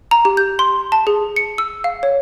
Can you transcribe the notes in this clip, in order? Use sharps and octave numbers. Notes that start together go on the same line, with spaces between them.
A#5
G4
G6
C6
A5
G#4
C#7
E6
F5
C#5